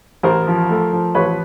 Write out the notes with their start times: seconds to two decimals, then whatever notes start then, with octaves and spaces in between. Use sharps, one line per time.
0.23 A1 A#4 C5
0.47 F3
0.70 A3
0.92 F3
1.15 A1 B4 C#5